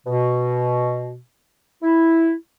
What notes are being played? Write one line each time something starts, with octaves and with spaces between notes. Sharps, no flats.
B2
E4